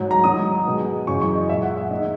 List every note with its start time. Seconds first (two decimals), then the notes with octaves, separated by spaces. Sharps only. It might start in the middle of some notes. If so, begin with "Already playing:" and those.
Already playing: G#2 F#3
0.11 A#5
0.24 G#2 D#3 F#3 D#6
0.66 B2 G#3
1.07 F#2 C#3 E3 G#3 C#6
1.22 C#6
1.35 D#5
1.49 A#2 G#3 E5
1.62 F#5
1.77 E5
1.90 D#3 G#3 D#5